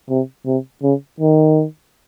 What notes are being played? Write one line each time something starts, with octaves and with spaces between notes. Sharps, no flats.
C3
C3
C#3
D#3